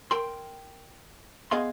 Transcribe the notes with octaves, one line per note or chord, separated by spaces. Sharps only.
A#4 G5 C6
B3 G#4 D#5 F5 C6